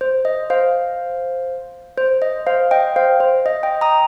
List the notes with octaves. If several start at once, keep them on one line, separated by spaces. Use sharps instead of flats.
C5
D#5
C5 F5
C5
D#5
C5 F5
D#5 G5
C5 F5
C5
D#5
D#5 G5
A#5 D#6